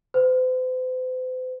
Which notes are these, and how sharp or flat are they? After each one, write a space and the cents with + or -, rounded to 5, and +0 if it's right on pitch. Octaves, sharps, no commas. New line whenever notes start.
C5 -45